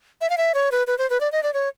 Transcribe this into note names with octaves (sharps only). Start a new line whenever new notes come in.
E5
F5
E5
C#5
B4
B4
C5
B4
D5
D#5
D5
C#5